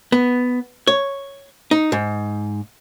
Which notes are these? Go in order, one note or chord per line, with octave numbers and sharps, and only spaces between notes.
B3
C#5
D#4
G#2